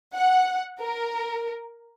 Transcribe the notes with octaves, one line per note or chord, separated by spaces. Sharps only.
F#5
A#4